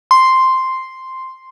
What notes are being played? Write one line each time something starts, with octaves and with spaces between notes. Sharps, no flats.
C6